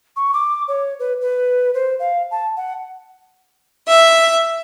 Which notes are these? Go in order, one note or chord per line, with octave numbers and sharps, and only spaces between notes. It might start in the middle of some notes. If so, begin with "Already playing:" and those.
C#6
D6
C#5
B4
B4
C5
F5
A5
F#5
E5